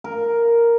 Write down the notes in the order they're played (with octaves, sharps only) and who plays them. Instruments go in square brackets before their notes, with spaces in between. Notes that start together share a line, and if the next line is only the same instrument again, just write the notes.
[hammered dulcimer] A#4